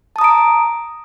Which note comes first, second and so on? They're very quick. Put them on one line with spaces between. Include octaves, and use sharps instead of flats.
A5 D#6 A#5 D7